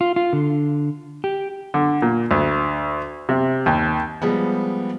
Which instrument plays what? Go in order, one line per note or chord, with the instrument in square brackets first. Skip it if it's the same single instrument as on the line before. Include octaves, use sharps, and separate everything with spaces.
[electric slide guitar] F4
F4
D3
G4
[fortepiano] D3
A#2
D2
C3
D#2
[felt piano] F3 G3 G#3 B3